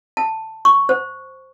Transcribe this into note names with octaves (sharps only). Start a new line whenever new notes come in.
A5
C#6
C5